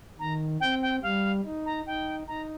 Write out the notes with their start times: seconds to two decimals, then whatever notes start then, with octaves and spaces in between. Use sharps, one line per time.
0.19 D#3 A#5
0.60 C4 G5
0.82 G5
1.03 G3 F5
1.45 D#4
1.65 A#5
1.86 D#4 G5
2.27 D#4 A#5